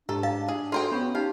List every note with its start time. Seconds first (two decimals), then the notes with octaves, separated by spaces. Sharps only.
0.09 G#2 D4 G4 A4 A5 A#5
0.23 D#5 F5 A5
0.48 G#4
0.72 F4 F#4 G#4 A4 C5 G5 C6
0.92 B3 C#4 C#5 B5 C#6
1.15 D#4 G4 C#5 F5